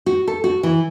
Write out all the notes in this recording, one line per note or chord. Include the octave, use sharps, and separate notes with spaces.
F#4
A4
F#4
E3